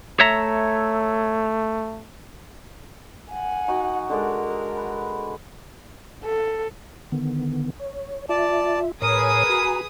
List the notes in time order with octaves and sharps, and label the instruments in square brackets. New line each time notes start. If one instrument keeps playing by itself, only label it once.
[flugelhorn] A3 [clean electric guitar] C#5 E5 A#5
[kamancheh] F#5 G#5
[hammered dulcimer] D#4 F#4
[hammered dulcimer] D3 G#3 D5 [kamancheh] A#4
[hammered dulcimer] B4
[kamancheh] A4
[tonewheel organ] D3 D#3 B3
C#5
[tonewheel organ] F4 E5 [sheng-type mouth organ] D5 A5
[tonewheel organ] A2 C#5 [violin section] G#4 B4 D#6 [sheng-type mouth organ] A#4
[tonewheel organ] F#4 G#5 A#5